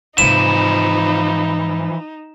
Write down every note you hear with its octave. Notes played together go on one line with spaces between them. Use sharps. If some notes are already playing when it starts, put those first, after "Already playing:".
G#2 C3 E3 F3 D#4 E7